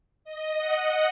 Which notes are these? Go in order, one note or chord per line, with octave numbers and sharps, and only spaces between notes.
D#5
F#5